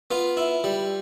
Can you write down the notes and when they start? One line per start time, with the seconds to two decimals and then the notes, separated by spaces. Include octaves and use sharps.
0.11 B3 F4
0.37 E4
0.64 G3